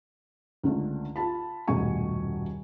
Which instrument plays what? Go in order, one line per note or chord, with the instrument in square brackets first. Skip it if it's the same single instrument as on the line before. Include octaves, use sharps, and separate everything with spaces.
[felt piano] C#2 D3 A3
F4 A5 B5
D#1 F#2 B2 A3 G#5 C#6